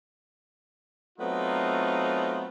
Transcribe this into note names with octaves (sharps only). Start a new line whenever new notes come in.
F#3 A3 B3 C4 D#4 F4